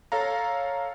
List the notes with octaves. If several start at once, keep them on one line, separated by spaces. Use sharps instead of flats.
A4 C#5 F5 A#5